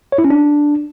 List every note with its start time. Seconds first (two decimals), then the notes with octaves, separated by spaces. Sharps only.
0.12 C#5
0.18 E4
0.24 C#4
0.30 D4